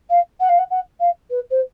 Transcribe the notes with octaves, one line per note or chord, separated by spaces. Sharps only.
F5
F#5
F5
F#5
F#5
F5
B4
C5